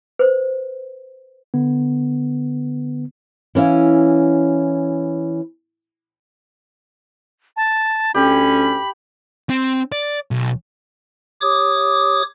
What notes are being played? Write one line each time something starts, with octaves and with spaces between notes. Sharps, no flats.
B4 C5
D3 B3
E3 C#4 E4 F5
A5
D2 C#4 G4 B5
C4
D5
B1
G4 C#5 D6 D#6